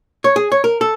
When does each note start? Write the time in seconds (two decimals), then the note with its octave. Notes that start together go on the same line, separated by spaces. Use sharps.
0.24 C#5
0.36 G#4
0.52 C#5
0.64 A#4
0.81 A4